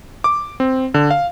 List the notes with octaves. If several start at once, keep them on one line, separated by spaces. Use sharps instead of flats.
D6
C4
D3
F5